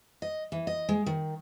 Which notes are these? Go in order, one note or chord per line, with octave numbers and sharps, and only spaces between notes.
D#5
E3
D#5
G#3
D#3